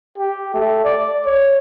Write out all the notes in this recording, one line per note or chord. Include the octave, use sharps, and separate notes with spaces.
G4
A3
D5
C#5